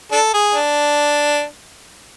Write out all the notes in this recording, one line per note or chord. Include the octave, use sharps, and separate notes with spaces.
D4 A4
G#4
D4